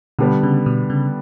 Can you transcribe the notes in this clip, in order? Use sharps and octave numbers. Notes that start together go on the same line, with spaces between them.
B2 D3 G3 B3
C#3
B2
C#3